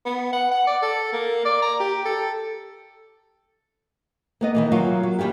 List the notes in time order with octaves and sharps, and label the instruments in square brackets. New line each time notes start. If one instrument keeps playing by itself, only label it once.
[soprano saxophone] B3
F#5
F#5
D5
A4
A#3
D5
A#5
G4
A4
[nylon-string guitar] A#3 B3 D#5
D#3 E3 A#3
F#3 A#3 F4 F5
F#3
E3 G3 G#3 F4 G4